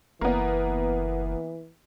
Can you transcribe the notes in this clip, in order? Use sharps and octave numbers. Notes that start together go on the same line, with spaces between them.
F#1 E3 A#3 B3